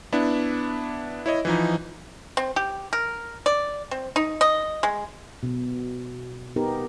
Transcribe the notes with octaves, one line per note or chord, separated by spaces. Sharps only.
B3 D4 E4
E4 C#5 D#5
E3 F3 D#4
C4
G4
A#4
D5
C4
D#4
D#5
G#3
B2
B3 D#4 G4 A#4